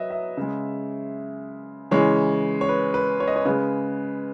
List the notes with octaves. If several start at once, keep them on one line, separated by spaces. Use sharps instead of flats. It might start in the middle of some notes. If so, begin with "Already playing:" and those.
Already playing: F#3 B4 D#5 E5
E5
C#3 G#3
C#3 E3 G#3 C#5
C#5
B4
B4
C#5
D#5
C#5
C#3 G#3 B4